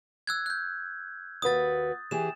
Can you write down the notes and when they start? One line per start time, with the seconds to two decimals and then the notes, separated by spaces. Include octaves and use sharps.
0.27 E6 F#6 G#6
0.46 F#6 G6
1.42 D#2 F#4 B4 D#6 A6
2.11 E3 G4 G#4 E7